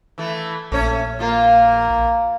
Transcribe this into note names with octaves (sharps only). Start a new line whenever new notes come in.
E3 A3
A#1 A3 C#4 C#5
A#3 F4